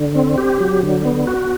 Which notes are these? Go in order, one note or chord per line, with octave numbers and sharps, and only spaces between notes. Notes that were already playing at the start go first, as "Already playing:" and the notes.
Already playing: D3
C4
G4
F#3
D3
B3
F#4